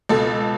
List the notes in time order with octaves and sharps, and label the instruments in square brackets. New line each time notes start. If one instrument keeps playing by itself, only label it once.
[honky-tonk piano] C#2 B2 A4